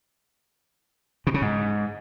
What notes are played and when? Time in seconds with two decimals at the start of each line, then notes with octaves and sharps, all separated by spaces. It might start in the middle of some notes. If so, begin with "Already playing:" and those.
1.27 B2
1.34 C#3
1.42 G#2